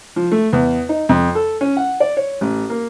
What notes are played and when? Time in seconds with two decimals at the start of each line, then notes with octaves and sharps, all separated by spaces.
0.16 F3
0.32 A3
0.53 E2
0.89 D#4
1.09 F2
1.35 A4
1.61 C#4
1.77 F#5
2.00 D5
2.17 C#5
2.41 A1
2.70 A#3